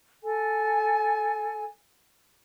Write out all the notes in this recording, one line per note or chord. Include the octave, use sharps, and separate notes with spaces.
A4 G#5